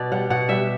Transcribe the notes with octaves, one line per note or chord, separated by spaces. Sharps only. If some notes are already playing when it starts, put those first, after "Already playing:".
Already playing: B2 D5
G3 F#5
B2 F#5
G3 E5